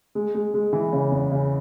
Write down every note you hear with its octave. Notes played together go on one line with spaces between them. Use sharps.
G#3
G#3
G#3
E3
C#3
E2
C#3